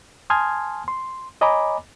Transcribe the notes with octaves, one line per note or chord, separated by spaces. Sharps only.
G#5 A5 C6 D#6 F6 G#6
C6
C#5 D#5 G#5 A#5 B5 D6